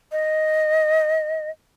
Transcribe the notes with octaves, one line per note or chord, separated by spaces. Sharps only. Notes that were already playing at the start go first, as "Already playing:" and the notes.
D#5